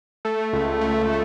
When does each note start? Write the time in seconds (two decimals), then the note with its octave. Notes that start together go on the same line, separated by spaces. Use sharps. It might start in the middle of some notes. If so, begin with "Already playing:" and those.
0.25 A3
0.53 C#2
0.81 A3